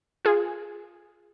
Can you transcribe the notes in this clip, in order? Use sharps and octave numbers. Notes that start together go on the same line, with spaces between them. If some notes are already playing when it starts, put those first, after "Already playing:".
F4 G#4